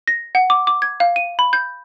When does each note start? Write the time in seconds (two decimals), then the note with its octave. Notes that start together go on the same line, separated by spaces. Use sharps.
0.08 A#6
0.35 F#5
0.50 D6
0.67 D6
0.82 G#6
1.00 F5
1.16 D#7
1.39 B5
1.53 G6